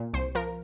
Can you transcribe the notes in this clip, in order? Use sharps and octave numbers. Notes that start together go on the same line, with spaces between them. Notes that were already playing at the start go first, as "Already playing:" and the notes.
Already playing: A#2
C2 C5
F3 A#4